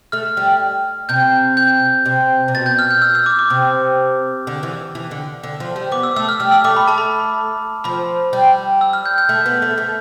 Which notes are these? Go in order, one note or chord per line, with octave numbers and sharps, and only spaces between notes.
A3 F6
G3
C3 G6
G6
C3
C3
B2 A6
G6
F6
G6
E6
E6
D6
D6
C3
D3
E3
E3
D3
D3
F3
G3
B3 D6
E6
A3 E6
F6
G3 E6
E6
A3 D6
B5
A3 A5
B5
F3 B5
G3
E6
F6
G6
G6
A3
B3
A3
A3